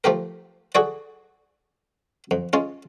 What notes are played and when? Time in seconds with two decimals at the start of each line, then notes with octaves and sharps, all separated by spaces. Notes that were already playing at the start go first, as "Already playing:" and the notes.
0.04 F3 A3 G4 A#4
0.75 F#4 G#4 A4 C#5 D5
2.31 F2
2.53 G#3 C#4 F4